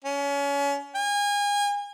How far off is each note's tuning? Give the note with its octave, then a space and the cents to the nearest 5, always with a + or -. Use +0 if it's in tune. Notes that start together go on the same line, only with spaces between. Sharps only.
C#4 +30
G#5 -30